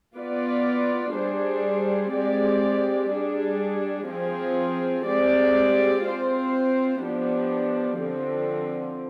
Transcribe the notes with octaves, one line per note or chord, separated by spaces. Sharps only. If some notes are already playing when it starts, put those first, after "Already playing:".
B3 F4 B4 D5
G3 D4 G#4 C5
G#3 C4 G4 D5
G3 D4 G#4
F3 C4 F4 G#4
G#3 C4 G4 D5
C4 F4 C5
F3 B3 D4 G4
D3 F3 C4